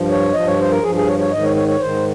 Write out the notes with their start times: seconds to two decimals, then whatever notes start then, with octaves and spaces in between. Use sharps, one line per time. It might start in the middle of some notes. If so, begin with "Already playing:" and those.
Already playing: G2 F3
0.10 C#5
0.34 G2 F3 D#5
0.47 C#5
0.59 C5
0.71 A#4
0.82 G2 F3 G#4
0.95 G#4
1.07 C#5
1.19 C#5
1.31 G#2 D#3 D#5
1.44 C#5
1.56 C#5
1.68 C#5
1.80 G#2 D#3 C5